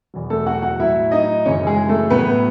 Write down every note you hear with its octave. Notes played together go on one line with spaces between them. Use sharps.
E2 B2 F#3
A3 A4
F#4 F#5
F#4 F#5
A2 F#3 E4 E5
D#4 D#5
F#2 C#3 E3 C#4 C#5
G#3 G#4
A3 A4
A2 F#3 B3 B4